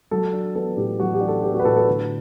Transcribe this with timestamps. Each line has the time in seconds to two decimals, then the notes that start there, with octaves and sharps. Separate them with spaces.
0.11 F#3 A4
0.33 D4
0.55 B3 A4
0.77 A2 G4
0.99 F#3 F#4
1.13 G4
1.21 D4
1.28 A4
1.43 B3 G4
1.54 F#4
1.60 B4
1.65 A2 A4
1.77 A4
1.87 D3